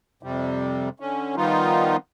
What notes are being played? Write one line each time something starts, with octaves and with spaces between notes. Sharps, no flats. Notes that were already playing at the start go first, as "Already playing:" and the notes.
F2 C3 G3
D3 C#4
D#3 F3 G3 B3 D#4 F4